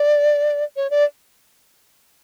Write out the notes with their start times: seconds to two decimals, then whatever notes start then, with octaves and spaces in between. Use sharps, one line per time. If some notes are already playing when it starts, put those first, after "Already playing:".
Already playing: D5
0.76 C#5
0.90 D5